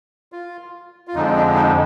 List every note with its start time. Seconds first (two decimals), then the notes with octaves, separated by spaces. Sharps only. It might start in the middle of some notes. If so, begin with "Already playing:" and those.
0.32 F4
1.08 F4
1.14 F2 D3 F3 G#3 D#4
1.36 D4
1.55 D#4